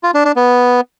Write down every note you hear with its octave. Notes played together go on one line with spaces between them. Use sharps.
F4
D4
D4
B3